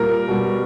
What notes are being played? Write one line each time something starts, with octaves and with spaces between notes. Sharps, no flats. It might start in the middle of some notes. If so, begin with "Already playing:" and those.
Already playing: A#2 G3 A#4
B2 G3